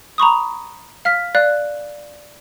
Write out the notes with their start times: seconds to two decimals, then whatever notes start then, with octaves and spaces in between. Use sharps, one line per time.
0.18 A#5 B5 C#6 D#6
1.05 F5 F6 B6
1.35 D5 F5 F#6